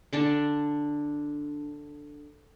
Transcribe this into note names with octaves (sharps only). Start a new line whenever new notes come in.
D3 D4 A5